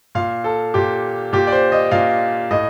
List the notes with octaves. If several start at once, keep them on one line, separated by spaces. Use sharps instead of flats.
A#2 F5
A4
A#2 G4
A#2 G4
D5
C5
D#5
A#2 F5
A2 D#5